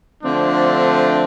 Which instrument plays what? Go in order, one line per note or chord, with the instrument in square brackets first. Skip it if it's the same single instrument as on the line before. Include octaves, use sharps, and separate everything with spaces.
[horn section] D3 F3 A3 C4 D4